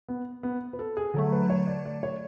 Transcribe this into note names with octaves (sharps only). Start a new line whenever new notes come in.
B3
B3
B4
A4
G#4
D3 F#3 A3 A4
B4
C#5
D5
D5
C#5